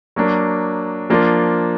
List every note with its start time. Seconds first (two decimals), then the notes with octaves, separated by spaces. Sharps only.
0.16 F#3 A#3 D4
1.10 F3 A#3 D4 F4